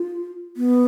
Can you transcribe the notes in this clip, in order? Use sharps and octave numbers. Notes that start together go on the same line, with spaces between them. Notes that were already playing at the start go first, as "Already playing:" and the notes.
Already playing: F4
B3